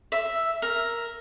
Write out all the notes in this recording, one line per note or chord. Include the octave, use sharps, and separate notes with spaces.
E5
A#4